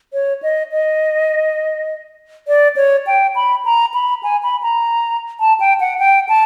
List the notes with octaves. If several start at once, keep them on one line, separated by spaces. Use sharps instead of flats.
C#5
D#5
D#5
D5
C#5
G5
B5
A#5
B5
G#5
B5
A#5
A5
G5
F#5
G5
A5